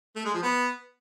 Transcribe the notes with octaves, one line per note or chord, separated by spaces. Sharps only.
A3
G#3
F3
B3